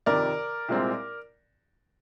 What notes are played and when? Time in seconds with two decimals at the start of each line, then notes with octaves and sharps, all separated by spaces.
0.06 F2 C3 D#3 A#4 D5
0.69 C2 A#2 G#3 C4